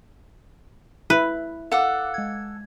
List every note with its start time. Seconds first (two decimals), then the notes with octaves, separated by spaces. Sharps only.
1.10 E4 B4
1.72 A4 F5 F#5 D6
2.14 G#3 G#6